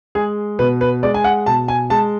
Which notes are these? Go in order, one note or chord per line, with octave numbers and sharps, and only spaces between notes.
G#3 G#4
B2 B4
B4
G#3 D5
G#5
F#5
B2 A5
G#5
G#3 A5